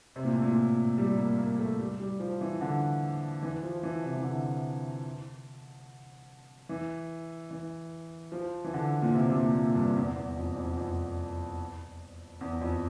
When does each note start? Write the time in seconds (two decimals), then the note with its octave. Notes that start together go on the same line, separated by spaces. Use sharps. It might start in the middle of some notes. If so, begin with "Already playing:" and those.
0.16 C3
0.25 A#2
0.33 A2
0.42 A#2
0.98 G3
1.18 A#3
1.38 A#3
1.59 A3
1.79 G3
2.00 G3
2.20 F3
2.41 E3
2.61 D3
3.43 E3
3.63 F3
3.83 E3
4.03 C3
4.16 E3
4.24 D3
6.69 E3
7.51 E3
8.32 F3
8.64 E3
8.74 D3
9.02 A#2
9.14 C3
9.29 C3
9.34 A#2
9.55 A#2
9.75 G2
9.96 E2
10.16 E2
10.36 F2
10.56 F2
10.77 F2
12.41 E2
12.61 F2